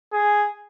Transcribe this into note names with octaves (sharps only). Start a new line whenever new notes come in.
G#4